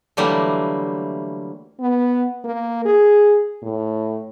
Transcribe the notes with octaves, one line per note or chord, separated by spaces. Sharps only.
D3 E3 F#3 G3 A3 A#3
B3
A#3
G#4
A2